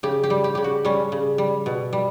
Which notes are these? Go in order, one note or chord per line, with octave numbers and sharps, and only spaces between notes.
C#3 G4
G4
G3
G4
C#3 G4
F#4
G3 C#4
C#3
G3
B2
G3